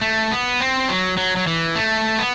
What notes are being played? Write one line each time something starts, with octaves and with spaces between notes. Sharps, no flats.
A3
B3
C4
F#3
F#3
F#3
E3
A3
B3